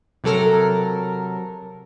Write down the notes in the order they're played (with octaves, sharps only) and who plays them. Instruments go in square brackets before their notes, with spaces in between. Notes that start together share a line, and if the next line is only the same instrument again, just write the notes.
[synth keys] C3 F#3 A4 A#4